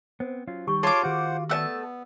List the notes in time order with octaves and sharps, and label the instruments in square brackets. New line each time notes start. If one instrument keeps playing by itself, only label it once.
[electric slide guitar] B3 C4 [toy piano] C5
[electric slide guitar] F#3 C#4 F4
[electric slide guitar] D#3 G3 [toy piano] G4 C#6
[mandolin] F4 D6 [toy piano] G#4 [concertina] C#5 A5 C6
[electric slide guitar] D#3 F#4 [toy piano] G4 [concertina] C5 F#5
[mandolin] A3 F#5 A5 [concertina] B3 [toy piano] D5 E6